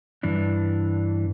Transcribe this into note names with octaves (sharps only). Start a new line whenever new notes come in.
G2 E3 D4